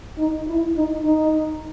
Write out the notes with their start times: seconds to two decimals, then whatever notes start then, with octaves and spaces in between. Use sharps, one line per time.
0.17 D#4
0.47 E4
0.75 D#4
1.04 D#4